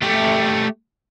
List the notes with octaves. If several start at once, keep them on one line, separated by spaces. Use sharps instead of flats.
A3 G4